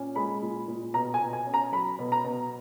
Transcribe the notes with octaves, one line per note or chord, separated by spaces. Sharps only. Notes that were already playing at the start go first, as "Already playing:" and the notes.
Already playing: A#2 C#4
G#3 B5
A#2
A#2
B2 A#5
G#5
B2
G#5
C#4
A#5
F#3 B5
B2
A#5
B2